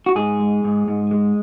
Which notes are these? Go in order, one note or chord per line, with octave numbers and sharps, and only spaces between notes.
F#4
G#2 G#4
G#3
G#2
G#2
G#3